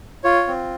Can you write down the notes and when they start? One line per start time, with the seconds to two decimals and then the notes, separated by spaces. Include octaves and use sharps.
0.24 F4 C#5
0.47 C4